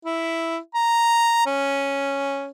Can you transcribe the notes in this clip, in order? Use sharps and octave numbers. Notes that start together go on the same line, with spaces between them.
E4
A#5
C#4